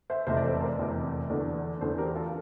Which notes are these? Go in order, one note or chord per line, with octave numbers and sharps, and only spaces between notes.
C5 E5
F1 E2 C3 C5 E5
D5
A4 C5
A#4 D5
F1 E2 C3
E2 D3 A3 D4
E2 D3 A3 D4 A4 C5
G4 A#4
F4 A4